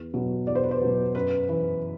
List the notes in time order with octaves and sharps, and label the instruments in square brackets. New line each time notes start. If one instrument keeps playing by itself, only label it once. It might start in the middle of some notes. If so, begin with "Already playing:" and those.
Already playing: [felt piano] E2
B2 F#3
E2 D5
C5
B4
C5
B2 F#3
F#2 B4
E3 B4